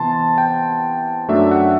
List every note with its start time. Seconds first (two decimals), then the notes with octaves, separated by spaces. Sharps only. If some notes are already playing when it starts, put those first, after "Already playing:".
Already playing: C3 E3 B3 A5 C6
0.38 G5
1.29 F#2 F#3 A3 D4 E5
1.51 F#5